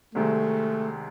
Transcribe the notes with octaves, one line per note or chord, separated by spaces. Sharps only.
C2 C3 D#3 G#3 A3